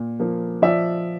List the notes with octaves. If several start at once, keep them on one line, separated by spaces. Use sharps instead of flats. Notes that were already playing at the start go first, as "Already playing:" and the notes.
Already playing: A#2
F3 A#3
F3 D5 E5